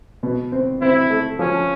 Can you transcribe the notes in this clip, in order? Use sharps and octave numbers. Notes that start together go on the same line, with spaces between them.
B2
C4
C4 E4
A3
F3 C#4